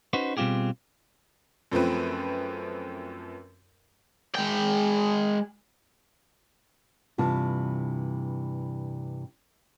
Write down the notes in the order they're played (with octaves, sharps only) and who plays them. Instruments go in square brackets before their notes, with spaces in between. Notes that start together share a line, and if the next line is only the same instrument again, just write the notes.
[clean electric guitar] C#4 D#4 F#4 B4 C5
B2 G3 C4 F4 G4 G#4
[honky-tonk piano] F#2 F3 A3 C4 B4
[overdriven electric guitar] G#3 G5
[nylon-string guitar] G2 C3 E3 F4 A5